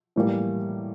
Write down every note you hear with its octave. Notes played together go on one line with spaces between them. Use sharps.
A2 E3 G3 A#3